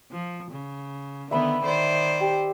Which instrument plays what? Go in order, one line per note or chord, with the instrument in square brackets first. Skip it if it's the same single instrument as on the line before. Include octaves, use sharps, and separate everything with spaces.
[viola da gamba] F3
C#3
[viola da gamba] D3 D#3 B3 [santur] E5 B5 D#6
[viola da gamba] D#3 C5 D5
[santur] G4